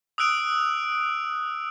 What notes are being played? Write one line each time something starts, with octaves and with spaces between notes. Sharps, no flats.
D#6 E6 F#6 D7 F7